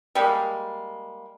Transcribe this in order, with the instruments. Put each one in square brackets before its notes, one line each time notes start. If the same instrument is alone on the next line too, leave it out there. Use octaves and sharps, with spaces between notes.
[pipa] G3 G#3 A#3